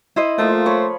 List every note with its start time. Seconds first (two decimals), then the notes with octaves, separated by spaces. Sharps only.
0.16 E4 C5 D#5
0.38 F3 A3 A#3 F4
0.66 C5 C#5 B5